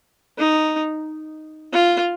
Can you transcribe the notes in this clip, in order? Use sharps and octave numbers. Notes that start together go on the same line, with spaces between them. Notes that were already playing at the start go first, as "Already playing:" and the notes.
D#4
F4